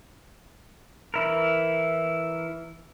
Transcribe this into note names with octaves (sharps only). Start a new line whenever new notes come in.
E3 E4 A#4